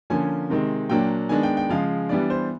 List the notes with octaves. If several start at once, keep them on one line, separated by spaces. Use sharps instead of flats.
D3 F3 A#3 C#4 G#5
C3 D#3 G#3 C4
A#2 F#3 A#3 D4 G5
D#3 G#3 B3 D4 G#5
G5
G5
C#3 F3 G#3 F5
E3 G3 B3 D4 D5
C5